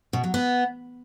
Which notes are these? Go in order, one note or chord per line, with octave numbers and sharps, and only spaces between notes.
B2
F#3
B3